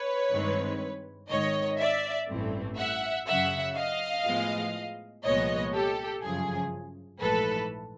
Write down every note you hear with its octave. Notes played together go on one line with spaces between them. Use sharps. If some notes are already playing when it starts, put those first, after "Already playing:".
Already playing: B4 C#5
G2 D#3 G#3 C4
G#1 G#2 D#3 C#5 D#5
D5 E5
A1 G2 E3 A3 C4
E5 F#5
F#2 C#3 F#3 E5 F#5
D#5 F5
A2 F3 G#3 B3
C2 A#2 F3 G#3 B3 C#5 D#5
G4 A4
G1 F#2 C#3 F3 G#4
A#1 G#2 E3 A3 A4 B4